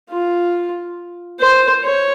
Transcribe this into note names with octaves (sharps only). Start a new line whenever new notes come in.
F4
C5
C#5